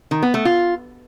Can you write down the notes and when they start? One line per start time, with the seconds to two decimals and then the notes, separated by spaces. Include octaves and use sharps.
0.11 D#3
0.22 B3
0.34 A3
0.45 F4